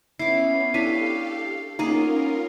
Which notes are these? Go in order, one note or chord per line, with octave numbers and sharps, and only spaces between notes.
B3 C#4 E4 D6 C7
D4 E4 G4 A4 C#5 F5 B6 D#7
A#3 B3 C#4 D#4 F4 G#4 A#4